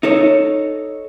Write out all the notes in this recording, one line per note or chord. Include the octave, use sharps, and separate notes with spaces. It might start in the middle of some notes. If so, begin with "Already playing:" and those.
D#4 A4 C#5